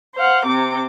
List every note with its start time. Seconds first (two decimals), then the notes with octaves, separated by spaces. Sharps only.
0.15 C5 F5 F#5
0.44 C3 C4 D6